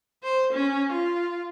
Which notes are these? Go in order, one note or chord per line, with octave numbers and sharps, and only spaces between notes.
C5
C#4
F4